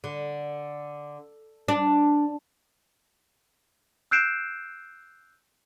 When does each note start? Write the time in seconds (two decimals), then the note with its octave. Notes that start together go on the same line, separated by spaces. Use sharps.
0.04 D3
1.68 D4
4.11 E6 F#6 G6 C7 D7 E7